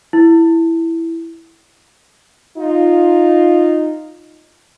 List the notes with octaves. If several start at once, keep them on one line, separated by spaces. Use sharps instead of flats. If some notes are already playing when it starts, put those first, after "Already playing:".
E4
D#4 F4